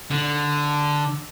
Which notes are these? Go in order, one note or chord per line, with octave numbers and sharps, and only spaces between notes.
D3